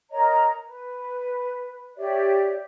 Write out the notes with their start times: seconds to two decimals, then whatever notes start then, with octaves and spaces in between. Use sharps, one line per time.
0.11 A#4 C#5 D#5 A#5
0.64 B4
1.97 G4 C#5 D5 E5